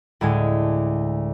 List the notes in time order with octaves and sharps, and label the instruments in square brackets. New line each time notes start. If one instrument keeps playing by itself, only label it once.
[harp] D2 A2 G#3 G#5